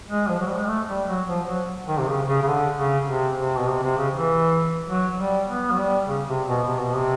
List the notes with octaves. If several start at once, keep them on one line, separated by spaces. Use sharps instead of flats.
G#3
F3
F#3
G3
G#3
A3
G3
F#3
F3
F#3
D#3
C3
C#3
C#3
C#3
D3
C#3
C3
C3
B2
C3
C3
C#3
E3
F#3
G3
B3
F#3
G3
C#3
C3
B2
C3
B2
C3